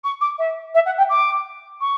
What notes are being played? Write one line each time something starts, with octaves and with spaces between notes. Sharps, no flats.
C#6
D6
E5
E5
F#5
G5
D6
C#6